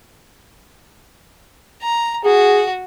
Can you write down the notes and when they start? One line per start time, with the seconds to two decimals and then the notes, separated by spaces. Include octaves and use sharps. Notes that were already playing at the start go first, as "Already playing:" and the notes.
1.82 A#5
2.25 F#4 G#4